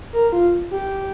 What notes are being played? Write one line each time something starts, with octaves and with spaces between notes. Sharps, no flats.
A#4
F4
G4